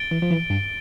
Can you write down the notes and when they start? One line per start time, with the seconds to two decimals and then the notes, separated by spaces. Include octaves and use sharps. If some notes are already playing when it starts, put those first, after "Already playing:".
Already playing: A6 D7 G7
0.11 E3
0.22 F3
0.31 E3
0.50 G2